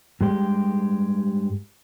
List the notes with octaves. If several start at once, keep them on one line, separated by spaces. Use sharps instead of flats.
G2 G#3 G4